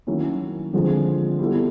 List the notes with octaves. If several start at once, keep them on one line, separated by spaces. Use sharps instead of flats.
D#3 F#3 A#3 C#4 E4
D3 F3 G#3 C4 F4
G3 B3 E4 A4